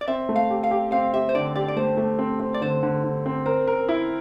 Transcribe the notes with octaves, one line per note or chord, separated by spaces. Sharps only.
D5
C4 E5
A3
F5
G4
F5
G4
C4 F5
G4 E5
C5
D3 D5
G4 D5
D5
A3 C5
A3
C4
C4
D5
D3 C5
D3
D3
C4
A#4 C5
A#4
E4